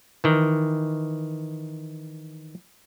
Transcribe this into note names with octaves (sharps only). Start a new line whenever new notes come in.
D#3 E3